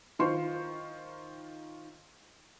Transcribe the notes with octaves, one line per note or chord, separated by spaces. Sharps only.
D#3 F4 C5 C6 C#6